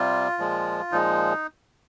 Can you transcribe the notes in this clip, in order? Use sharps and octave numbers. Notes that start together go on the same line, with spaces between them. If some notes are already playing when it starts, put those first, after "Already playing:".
Already playing: C3 G3 F4
A#2 F3 G#3
A#2 F3 G#3 D#4